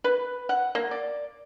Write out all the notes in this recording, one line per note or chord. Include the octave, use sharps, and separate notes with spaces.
B4
F#5
A#3
D5